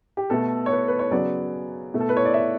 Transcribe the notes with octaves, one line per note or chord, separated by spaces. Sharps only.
G4
B2 A3 A4
C#5
B4
B4
C#5
C#3 F#3 B3 D5
B2 A3
A4
B4
C#5
D5
E5